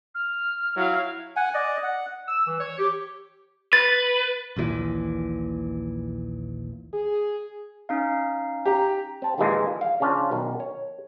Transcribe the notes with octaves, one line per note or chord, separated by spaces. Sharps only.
F6
F#3 E4 F5
F#5 G#5
D5 D#5
F#5
E6
E3
C#5
G4
B4 A6
A#1 D#2 A#2 E3
G#4
C#4 D#4 F5
G4 A#5
C4 A5
A#1 D#2 A#2 E3 G#3 A#3
F5
C#3 F3 C#4 D4 F4
B1 D#3
C#5